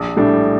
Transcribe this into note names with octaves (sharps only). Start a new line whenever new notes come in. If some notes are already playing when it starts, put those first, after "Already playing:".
Already playing: A#1
A2 G3 D4